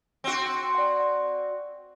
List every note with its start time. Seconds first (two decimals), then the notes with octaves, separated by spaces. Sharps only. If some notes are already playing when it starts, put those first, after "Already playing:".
0.24 C4 F#4
0.75 D5 F#5